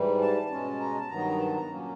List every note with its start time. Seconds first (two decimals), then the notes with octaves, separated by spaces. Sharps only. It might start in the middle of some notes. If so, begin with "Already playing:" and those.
Already playing: G#2 E3 G3
0.21 A5
0.50 B2 G#3 C#4
0.80 A#5
0.95 A5
1.09 G2 D#3 F#3 B3 A#5
1.40 A5
1.54 A#5
1.69 A#2 F#3 A#3 C#4